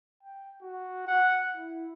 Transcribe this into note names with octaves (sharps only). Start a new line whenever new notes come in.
G5
F#4
F#5
E4